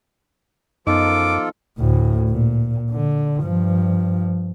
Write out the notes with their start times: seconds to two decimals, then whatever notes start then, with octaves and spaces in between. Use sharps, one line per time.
0.87 F#2 F3 B3 D#4 F4 A4 D#5 D6
1.78 D2 A2
2.30 A#2
2.91 D3
3.41 G2 F3